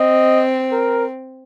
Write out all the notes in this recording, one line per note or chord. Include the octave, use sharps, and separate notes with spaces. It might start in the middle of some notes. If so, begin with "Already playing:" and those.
Already playing: C4 D#5
A#4